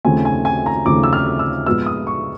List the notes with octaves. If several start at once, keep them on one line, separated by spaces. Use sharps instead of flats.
D#2 C#3 F3 A3 C4 G#5
G#5
G#5
A#5
D#2 C#3 F3 A3 C4 D6
E6
F6
E6
A#2 F3 G#3 B3 E6
D#6
C#6